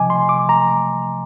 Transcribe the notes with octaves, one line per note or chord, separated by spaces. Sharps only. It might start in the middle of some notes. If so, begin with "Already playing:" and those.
Already playing: C2 C3 F3 D#5 G#5 D6
C6
D6
A#5